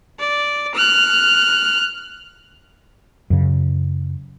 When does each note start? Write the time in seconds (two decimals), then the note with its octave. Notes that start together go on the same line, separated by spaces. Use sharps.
0.19 D5
0.75 F6 F#6
3.30 F#2 C#3